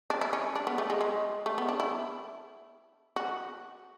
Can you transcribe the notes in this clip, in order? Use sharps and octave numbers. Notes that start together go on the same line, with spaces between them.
D4
E4
C#4
D4
B3
A3
G#3
G#3
A3
B3
D4
E4
F#4